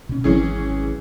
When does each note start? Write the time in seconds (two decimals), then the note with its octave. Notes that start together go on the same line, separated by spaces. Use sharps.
0.09 B2 C#4
0.24 G#1 E3 F#3 G#3 C#4 G#4